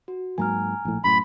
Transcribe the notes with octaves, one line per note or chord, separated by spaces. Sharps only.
F#4
G#2 F#3 A#3 G#5 A#5 F6
A#1 A2
F#2 A2 B5 C6